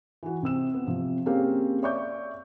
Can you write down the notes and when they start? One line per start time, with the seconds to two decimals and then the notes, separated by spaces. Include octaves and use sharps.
0.23 E3 F#4
0.42 C3 C4 E6 E7
0.74 B3
0.87 C3 F3
1.26 A#3 C4 C#4 G4 G#4 F5
1.83 C#5 D5 E5 C#6 D6 G6